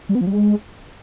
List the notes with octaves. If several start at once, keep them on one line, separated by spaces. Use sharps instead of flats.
G3
B3
F3
G3
G#3